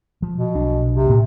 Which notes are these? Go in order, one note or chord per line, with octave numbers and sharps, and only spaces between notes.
F3
B2
B1 D4
C3
A2 A#3